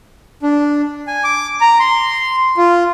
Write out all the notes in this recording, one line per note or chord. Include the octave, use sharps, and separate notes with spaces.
D4
G#5
D6
A#5
C6
F4